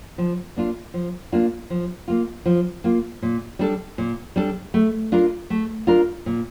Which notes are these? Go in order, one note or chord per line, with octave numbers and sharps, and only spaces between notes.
F3
A#3 D4 F4
F3
A#3 D4 F4
F3
A#3 F4
F3
A#3 F4
A#2
G3 D4 A4
A#2
G3 D4 A4
A3
D4 F4 A#4
A3
D4 F4 A#4
A#2